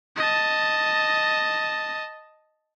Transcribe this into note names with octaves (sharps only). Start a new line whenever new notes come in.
D#5 A5